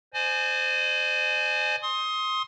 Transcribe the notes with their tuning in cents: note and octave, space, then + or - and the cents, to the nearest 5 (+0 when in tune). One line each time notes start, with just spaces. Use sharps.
C5 -10 D#5 -45 G#5 +20
C6 +20 D#6 +20